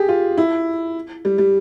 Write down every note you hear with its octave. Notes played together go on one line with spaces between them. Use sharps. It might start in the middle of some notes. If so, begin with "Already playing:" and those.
Already playing: G4 G#4
F4
E4
G3
G3